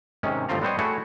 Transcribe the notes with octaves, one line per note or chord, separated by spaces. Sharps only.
G#2 C3 D#3 C#4
G1 F3 A3 C4 F4 A#5
G3 B3 C4 C5 C#5 D#5
A3 E4 F#4 G#4 C#5